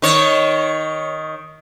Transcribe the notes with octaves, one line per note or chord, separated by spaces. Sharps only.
D#3 C#5